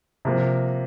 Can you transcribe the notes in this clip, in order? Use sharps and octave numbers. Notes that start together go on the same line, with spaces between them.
C3 F3 A#3